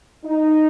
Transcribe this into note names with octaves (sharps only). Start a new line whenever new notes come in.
D#4